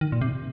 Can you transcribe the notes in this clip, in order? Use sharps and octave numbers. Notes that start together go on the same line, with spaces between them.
D#3
A#2
C3